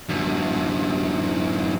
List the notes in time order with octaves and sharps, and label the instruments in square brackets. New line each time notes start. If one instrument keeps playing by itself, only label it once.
[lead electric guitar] F#2 D3